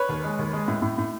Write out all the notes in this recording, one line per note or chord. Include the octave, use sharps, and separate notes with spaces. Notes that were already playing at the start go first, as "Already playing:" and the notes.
Already playing: B4 C#5
D#2
G#3
D#2
G#3
A2
A2
A2